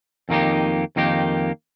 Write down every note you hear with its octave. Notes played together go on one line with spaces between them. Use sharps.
F2 D#3 A#3 D#4 G4
F2 D#3 A#3 D#4 G4